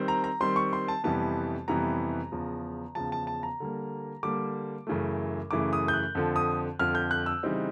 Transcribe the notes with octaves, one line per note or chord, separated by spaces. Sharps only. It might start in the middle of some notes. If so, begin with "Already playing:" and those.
Already playing: D#3 G3 C4
A#5
A#5
D#3 G3 C4 C6
C#6
C6
A5
F2 C3 E3 G3 B3 A5
F2 C3 E3 G3 B3 A#5
E2 C#3 F3
E2 C#3 F3 A5
A5
A5
A#5
D3 G3 A#3
D3 G3 A#3 D6
F#2 C#3 E3 A3
F#2 C#3 E3 A3 D6
D#6
G6
F#6
F2 D3 F3
D#6
F2 D3 F3 F6
G6
F#6
E6
C#3 E3 G3 C4 D#4